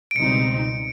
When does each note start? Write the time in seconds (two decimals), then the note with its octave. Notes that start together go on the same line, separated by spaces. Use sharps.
0.11 D7
0.16 C#2 B2 G3 C4 D#4 C#7